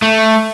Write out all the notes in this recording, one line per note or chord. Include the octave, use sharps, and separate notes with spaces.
A3